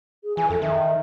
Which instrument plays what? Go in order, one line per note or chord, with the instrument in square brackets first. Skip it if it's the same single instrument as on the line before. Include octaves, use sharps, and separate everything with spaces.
[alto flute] G#4
[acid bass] E3 [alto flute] G#5
[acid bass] F2 [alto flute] A4
[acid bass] D#3 [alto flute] E5